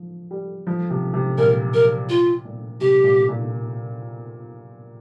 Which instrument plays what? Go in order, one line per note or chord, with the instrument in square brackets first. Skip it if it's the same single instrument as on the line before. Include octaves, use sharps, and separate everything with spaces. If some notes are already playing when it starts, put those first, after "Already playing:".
Already playing: [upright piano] F3
G3
F3
C3
C3
[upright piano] A#2 [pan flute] A#4
[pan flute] A#4
F4
[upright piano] A#2
[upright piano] C3 [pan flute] G4
[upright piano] A#2
A#2